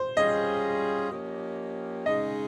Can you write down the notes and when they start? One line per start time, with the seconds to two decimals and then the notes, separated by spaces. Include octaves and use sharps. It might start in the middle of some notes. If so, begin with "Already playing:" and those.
Already playing: C5
0.17 G3 C#4 F4 G#4 D#5
1.11 F3 A#3 C#4 G4
2.06 C#3 G#3 D#4 G#4 D#5